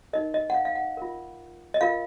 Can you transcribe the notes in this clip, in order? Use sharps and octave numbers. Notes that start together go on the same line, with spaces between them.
D#4 A#4 D#5
D#5
F#5
F5
F5
F#5
F4 A#4
D#5
F4 A#4 F5